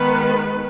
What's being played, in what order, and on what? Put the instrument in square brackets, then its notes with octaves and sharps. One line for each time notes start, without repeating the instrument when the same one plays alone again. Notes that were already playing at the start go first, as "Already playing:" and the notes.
Already playing: [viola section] D#3 G#3 B3 B4